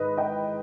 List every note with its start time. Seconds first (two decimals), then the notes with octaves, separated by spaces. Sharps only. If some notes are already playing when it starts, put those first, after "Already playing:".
Already playing: G#2 D#3 B4 D#5
0.17 D#5 G5